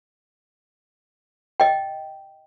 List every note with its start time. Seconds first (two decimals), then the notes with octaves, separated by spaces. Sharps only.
1.60 D#5 G5